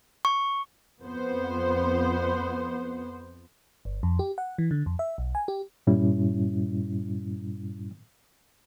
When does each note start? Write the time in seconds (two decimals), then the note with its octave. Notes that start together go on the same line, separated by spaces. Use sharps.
0.25 C#6
1.02 F2 B3 C5
3.85 G1
4.03 F2
4.19 G4
4.38 F#5
4.58 E3
4.71 D3
4.86 F2
4.99 E5
5.18 B1
5.35 G#5
5.48 G4
5.87 G2 A#2 G3 C#4 E4